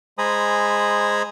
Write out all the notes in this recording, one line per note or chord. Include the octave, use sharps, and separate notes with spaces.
G#3 C5 G#5 A#5 B5 D#6